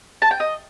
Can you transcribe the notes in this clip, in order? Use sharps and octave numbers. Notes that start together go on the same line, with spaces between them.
A5
G5
D#5